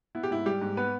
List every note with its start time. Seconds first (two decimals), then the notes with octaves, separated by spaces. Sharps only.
0.15 B3 E4
0.23 G4
0.31 G#2 E4
0.46 G3 G4
0.62 G#2
0.77 B3 B4